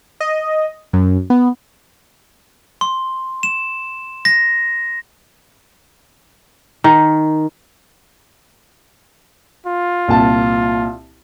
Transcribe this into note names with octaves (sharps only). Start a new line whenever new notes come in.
D#5
F#2
B3
C6
E7
A#6
D#3
F4
C2 A#2 A5